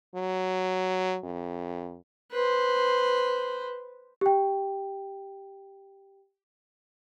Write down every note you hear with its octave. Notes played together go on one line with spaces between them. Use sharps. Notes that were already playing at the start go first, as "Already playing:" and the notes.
F#3
F2
B4 C5
G4 G5